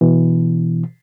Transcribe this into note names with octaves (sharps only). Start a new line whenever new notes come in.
B2 E3